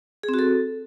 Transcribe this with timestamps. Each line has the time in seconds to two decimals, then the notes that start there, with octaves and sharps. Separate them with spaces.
0.23 G#4
0.29 C4
0.34 F#4
0.39 A4